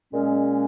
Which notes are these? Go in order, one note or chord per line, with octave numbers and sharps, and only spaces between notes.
A#2 G#3 C#4